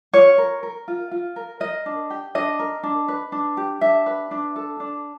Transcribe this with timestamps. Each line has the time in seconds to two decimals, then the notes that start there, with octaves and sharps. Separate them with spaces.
0.13 F4 C#5
0.38 A#4
0.63 A#4
0.88 F4
1.11 F4
1.36 A#4
1.60 A#4 D#5
1.86 D4
2.10 G4
2.35 D4 D#5
2.59 A#4
2.83 D4
3.08 B4
3.32 D4
3.57 G4
3.81 D4 E5
4.06 B4
4.31 D4
4.56 A4
4.80 D4